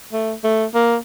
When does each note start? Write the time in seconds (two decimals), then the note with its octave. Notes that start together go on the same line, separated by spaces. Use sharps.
0.13 A3
0.44 A3
0.75 A#3